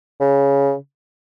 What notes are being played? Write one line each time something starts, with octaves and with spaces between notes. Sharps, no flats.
C#3